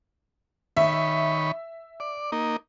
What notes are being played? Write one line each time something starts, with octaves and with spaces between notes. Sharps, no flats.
D#3 C#5 E5 B5
D5
A#3 D#4